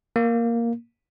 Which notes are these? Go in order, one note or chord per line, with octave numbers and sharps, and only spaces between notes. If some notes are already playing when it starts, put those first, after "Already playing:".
A#3